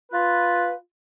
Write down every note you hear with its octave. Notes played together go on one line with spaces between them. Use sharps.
F4 B4